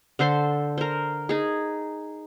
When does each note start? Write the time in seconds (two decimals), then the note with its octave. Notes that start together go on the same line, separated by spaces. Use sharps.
0.19 D3 A4 C5 C6
0.78 A#4 C5
1.29 D#4 G#4